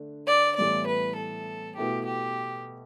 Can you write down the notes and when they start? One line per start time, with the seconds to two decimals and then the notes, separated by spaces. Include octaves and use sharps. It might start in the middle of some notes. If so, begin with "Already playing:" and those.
Already playing: D3 A3 D4
0.27 D5
0.57 A2 E3 G3 B3 D5
0.87 B4
1.17 A4
1.77 B2 A3 E4 G4
2.07 G4